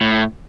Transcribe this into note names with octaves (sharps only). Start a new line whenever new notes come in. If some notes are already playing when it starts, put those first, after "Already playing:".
A2